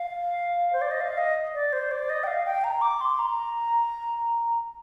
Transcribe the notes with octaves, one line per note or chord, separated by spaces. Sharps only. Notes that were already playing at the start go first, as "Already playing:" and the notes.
Already playing: F5
C5
D5
D#5
F5
D#5
D5
C5
D5
D#5
G5
F5
G5
A#5
D6
C6
A#5